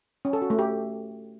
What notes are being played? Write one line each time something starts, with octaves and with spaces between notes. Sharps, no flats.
C#4
A4
F#4
A3
G4